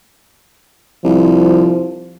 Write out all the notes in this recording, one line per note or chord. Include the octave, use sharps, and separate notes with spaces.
C2 F3